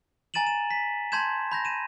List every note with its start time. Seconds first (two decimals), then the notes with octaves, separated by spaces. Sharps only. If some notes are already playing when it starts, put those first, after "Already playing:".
0.34 G#5 A#5 A6 D#7 E7 F#7
0.47 E7
0.71 B6
1.12 A5 C6 G6 G#6 E7
1.52 B5 G6 A#6
1.65 D#7 E7